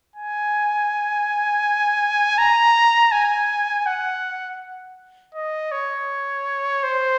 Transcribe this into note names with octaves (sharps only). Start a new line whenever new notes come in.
G#5
A#5
G#5
F#5
D#5
C#5
C5